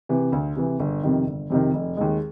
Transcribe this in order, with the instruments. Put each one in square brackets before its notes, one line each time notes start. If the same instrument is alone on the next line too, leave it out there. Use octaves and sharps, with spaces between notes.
[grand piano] C3 E3
D2
C3 E3
G1
F2 C3 D#3
G1
F2 C3 D#3
F1
D#2 D#3 G#3